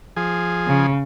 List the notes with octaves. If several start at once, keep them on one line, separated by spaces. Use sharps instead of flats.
F3 G#4
C#3